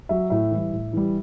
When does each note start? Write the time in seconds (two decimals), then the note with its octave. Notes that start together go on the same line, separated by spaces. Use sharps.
0.09 F#3 E5
0.30 A2 E5
0.51 E3 G3
0.73 A2
0.93 E3 G3